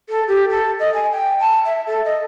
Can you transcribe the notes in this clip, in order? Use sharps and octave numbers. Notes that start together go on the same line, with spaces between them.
A4
G4
A4
D#5
G#5
G5
A5
E5
A4
D#5